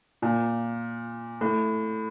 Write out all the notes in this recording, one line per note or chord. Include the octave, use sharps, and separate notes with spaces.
A#2
A2